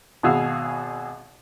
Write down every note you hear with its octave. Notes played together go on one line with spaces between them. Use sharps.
G#1 B2 F#4 G#4 F5 E6